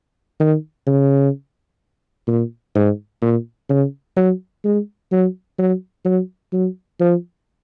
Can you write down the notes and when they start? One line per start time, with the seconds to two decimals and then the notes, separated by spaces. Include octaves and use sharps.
0.40 D#3
0.87 C#3
2.28 A#2
2.75 G#2
3.22 A#2
3.70 C#3
4.17 F#3
4.65 G#3
5.12 F#3
5.59 F#3
6.05 F#3
6.52 F#3
7.00 F3